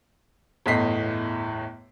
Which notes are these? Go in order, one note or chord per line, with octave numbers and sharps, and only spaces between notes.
G1 E2 A2 D#5 B6 C7